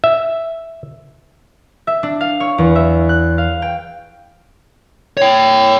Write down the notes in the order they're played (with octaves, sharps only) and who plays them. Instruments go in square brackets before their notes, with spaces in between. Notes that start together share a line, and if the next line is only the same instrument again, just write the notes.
[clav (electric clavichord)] E5
[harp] E5
D4
F5
C#5
E2
E5
F#6
F5
G5
[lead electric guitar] C#5 G5